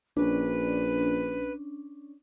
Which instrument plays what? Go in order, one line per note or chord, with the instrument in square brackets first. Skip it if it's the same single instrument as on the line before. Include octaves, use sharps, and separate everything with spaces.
[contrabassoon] A#1 [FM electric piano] C#4 D4 [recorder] B4